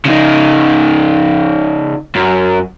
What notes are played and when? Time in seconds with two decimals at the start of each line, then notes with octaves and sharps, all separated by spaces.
0.05 C#3 D#4
2.16 F#2